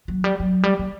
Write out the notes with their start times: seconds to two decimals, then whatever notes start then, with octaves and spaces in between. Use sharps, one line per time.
0.08 F#3
0.24 G3
0.40 F#3
0.63 G3
0.79 G3